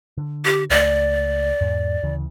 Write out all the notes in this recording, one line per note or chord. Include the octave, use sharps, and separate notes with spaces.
D3
G4
C#2 A3 D5
E2 G#2
D2 C#3 E3